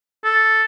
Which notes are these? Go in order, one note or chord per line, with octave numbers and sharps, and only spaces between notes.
A4